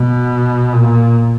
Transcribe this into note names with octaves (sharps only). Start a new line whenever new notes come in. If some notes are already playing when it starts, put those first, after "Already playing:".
Already playing: B2
A#2